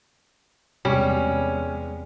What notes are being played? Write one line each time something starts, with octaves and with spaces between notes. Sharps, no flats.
E2 C3 G3 G#3 C#4 G#4